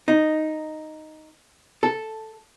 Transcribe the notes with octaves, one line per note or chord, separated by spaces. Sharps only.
D#4
A4